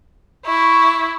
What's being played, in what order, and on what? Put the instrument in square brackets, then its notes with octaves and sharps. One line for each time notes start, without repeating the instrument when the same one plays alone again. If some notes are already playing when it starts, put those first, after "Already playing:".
[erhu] E4 [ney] C#6